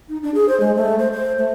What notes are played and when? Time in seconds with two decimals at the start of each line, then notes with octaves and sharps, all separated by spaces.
0.09 D#4
0.23 D4
0.34 G#4
0.49 C5
0.60 G#3
0.76 A3
0.99 C5
1.12 C5
1.38 A3